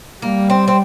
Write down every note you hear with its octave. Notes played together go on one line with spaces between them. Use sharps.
G3 A#3
C4
C4